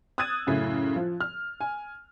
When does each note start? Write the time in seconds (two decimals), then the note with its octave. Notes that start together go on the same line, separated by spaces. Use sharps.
0.18 D#6 E6 F#6 G#6 A6 D#7
0.47 F#2 A2 C#3 C#4 E4
0.96 F3
1.20 F6
1.60 G#5